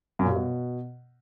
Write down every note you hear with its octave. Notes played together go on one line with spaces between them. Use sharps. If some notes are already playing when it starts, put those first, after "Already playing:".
F#2
A#2
G3
B2